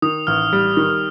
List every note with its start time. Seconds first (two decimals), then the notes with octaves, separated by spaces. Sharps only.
0.02 D#3 D#6
0.27 A1 F6
0.53 G3
0.77 D#3